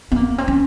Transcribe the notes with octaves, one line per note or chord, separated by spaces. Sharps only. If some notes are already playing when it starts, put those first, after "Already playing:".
B3
A#3
C4
C#4